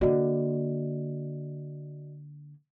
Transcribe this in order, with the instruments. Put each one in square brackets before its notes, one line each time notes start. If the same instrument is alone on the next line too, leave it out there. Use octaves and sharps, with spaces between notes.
[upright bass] D3 A#3 [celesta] F#4 D5 D#5